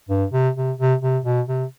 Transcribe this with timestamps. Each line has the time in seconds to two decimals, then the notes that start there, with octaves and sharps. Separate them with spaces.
0.09 G2
0.33 C3
0.56 C3
0.78 C3
1.02 C3
1.25 B2
1.48 C3